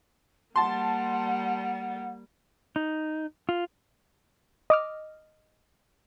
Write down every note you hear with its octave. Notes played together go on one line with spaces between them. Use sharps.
G3 A#3 F#5 A5 C6
D#4
F4
D#5 D6 F6